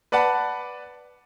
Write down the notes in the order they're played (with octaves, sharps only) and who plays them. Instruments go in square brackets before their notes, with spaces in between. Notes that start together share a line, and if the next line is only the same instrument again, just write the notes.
[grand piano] B4 D5 F#5 A5 B5